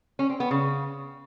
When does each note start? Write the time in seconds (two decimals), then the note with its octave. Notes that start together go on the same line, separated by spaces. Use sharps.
0.19 C#4
0.30 C4
0.40 B3
0.51 C#3